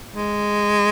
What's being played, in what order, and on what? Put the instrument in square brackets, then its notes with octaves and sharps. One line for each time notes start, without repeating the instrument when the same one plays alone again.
[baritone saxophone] G#3